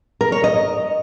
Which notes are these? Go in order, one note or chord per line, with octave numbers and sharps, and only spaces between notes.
A#4
C#5
D#5